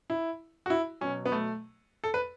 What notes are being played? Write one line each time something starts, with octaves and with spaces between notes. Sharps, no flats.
E4
F#4
E4
B2 F#3 C#4
B3
A3
A4
B4